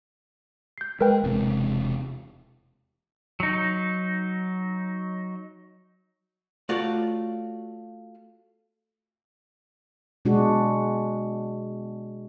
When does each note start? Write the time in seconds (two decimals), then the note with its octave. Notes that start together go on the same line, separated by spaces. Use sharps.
0.78 G6 C7
1.01 G#3 A#4 B4 G5
1.24 E1 C3 G#3
3.40 F#3 D#4
6.69 A3 F4 F#4 C#5 D5
10.25 B2 G#3 D4 F#4